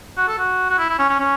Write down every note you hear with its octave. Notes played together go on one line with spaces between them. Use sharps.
F#4
A4
F#4
F#4
E4
E4
C#4
C#4
C#4